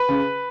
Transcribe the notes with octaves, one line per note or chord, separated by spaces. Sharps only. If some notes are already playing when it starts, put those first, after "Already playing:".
Already playing: B4
C#3